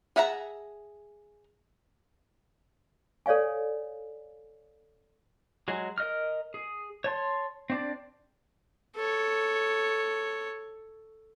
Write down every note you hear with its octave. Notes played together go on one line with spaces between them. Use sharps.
G#4 E5 F#5 A5 A#5
A4 C#5 D5 F5 G#5
F#3 G#3 G#4
A#4 D#5 F6
G#4
C#5 A5 C6
C4 D4 D5
A4 C#5